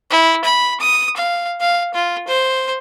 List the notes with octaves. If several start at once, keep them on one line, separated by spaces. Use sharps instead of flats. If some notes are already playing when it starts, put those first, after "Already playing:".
E4
B5
D#6
F5
F5
F4
C5